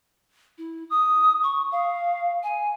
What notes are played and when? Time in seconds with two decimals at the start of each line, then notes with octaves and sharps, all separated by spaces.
0.58 E4
0.90 D#6
1.43 C#6
1.72 F5
2.43 G#5